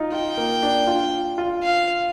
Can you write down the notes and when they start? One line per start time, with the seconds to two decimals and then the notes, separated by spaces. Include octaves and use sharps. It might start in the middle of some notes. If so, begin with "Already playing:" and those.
Already playing: D#4 F4
0.12 F4 G5
0.37 A#3
0.63 D4
0.87 F4
1.38 F4
1.62 F5